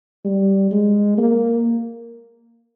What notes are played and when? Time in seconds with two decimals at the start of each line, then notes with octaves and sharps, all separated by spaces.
0.25 G3
0.71 G#3
1.18 A#3